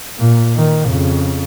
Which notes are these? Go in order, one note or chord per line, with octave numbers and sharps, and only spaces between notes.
A#2
D#3
F2 C#3